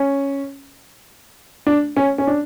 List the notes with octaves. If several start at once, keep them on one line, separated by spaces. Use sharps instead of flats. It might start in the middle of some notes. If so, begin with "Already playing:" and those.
Already playing: C#4
D4
C#4
C#4
D4